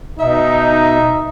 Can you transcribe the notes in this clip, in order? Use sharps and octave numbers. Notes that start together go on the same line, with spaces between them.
B2 D#4 E5